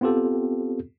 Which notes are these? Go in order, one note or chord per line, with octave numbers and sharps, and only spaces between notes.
B3 C4 F4 G4 A4